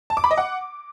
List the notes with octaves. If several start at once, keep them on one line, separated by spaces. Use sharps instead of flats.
A5
D6
B5
D#5
F#5